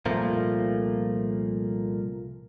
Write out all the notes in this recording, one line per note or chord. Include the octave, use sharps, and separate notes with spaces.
C2 A#2 F3 A3 A#3